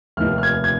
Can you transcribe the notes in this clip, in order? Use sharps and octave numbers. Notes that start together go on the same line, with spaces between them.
F1 D#2 D#3 F6
F6
G#6
G#6